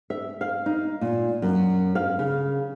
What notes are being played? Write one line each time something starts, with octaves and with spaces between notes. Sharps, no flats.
E5
F5
D#4
A#2
F#2
F5
C#3